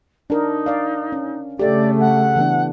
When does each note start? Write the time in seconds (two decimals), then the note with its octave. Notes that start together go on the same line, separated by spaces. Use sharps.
0.30 D4 D#4 A#4
0.66 D5 F5
1.12 C#4
1.59 C#3 A3 G4 A4 D5
1.99 F#5
2.36 E3 B3 D4